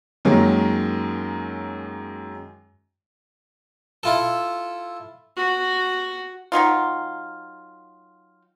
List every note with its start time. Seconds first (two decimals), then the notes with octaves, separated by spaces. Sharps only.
0.25 F#2 D#3 F#3 G#3 A#3
4.03 E4 F4 A4
5.37 F#4
6.52 D#3 F#3 D#4 F4